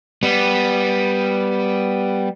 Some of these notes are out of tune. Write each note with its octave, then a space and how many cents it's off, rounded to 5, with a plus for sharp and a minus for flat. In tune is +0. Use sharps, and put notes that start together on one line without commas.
G3 +0 B3 +0